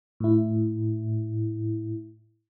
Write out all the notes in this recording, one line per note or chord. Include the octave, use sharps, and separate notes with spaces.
A2 E4